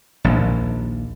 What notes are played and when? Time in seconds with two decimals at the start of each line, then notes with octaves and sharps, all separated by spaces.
0.24 A#1 D#2